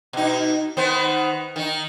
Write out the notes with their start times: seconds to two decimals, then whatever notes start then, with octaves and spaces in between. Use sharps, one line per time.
0.13 B2 D#4
0.77 D#3 B3 C5
1.56 D#3 D#4